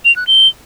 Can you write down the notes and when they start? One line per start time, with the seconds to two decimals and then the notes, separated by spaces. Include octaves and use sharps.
0.05 F7
0.16 F#6
0.27 G7